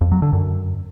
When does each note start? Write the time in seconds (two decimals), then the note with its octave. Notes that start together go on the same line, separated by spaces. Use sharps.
0.01 F2
0.12 F#3
0.22 D3
0.33 F#2